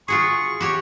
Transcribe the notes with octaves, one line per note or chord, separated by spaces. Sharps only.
F4 F#4 G#4 C#6
F#4 G4 C#5